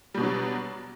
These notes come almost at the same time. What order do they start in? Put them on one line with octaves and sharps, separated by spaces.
G3 B2 D4 F#3